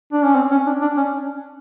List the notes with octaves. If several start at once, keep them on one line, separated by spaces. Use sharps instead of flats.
D4
C#4
C4
C#4
D4
D4
C#4